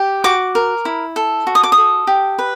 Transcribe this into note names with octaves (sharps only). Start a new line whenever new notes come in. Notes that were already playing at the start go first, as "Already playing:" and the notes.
Already playing: G4
F#4 D6
A#4
E4
A4
F#4
D#6
D6
D#6
A4
G4
B4